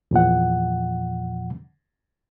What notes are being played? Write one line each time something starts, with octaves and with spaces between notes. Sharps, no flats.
E2 A#2 F3 F#5